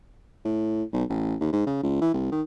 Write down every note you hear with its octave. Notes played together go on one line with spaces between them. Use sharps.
A2
B1
A1
D#2
G#2
C#3
C#2
E3
C2
D#3